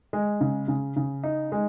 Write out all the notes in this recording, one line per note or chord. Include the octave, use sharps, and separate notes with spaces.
G#3
C#3
C#3
C#3
D#4
G#3